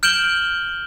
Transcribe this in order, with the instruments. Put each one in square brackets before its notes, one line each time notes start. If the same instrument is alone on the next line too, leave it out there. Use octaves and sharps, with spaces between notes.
[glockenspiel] F6 G6 D7 E7 F#7 G7